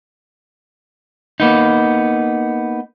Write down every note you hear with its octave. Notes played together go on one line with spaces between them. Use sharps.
A#3 B3 D#4